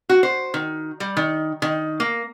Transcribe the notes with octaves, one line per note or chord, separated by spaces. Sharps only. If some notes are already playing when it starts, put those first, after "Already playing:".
F#4
C5
D#3
G3
D#3
D#3
A#3